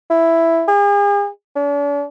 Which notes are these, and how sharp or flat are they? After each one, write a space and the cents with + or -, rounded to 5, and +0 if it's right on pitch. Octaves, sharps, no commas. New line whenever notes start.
E4 +5
G#4 -40
D4 -45